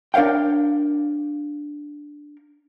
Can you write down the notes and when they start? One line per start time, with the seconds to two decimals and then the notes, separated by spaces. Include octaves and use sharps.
0.14 D4 A#4 C#5 F5 G5